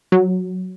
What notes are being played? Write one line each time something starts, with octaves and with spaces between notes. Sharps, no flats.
F#3